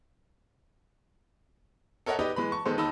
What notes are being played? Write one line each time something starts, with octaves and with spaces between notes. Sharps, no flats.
A4 A#4 C#5 D#5 E5 F#5
D#4 G4 B4 D5 D#5
E3 G#3 B4 B5
A5 C#6
D#3 G#3 B3 A4 C5
D#2 D#3 D#4 A5 B5 E6